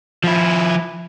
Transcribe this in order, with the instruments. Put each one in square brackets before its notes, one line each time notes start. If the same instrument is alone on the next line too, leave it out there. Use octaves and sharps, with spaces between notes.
[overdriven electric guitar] F3 E4